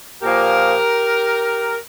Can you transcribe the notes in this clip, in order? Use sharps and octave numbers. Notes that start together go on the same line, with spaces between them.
A#2 F3 A#3 G4 A#4